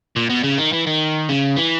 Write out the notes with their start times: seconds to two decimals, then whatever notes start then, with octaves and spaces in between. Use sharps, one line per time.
0.16 A#2
0.30 B2
0.44 C#3
0.59 D#3
0.73 E3
0.87 D#3
1.29 C#3
1.57 E3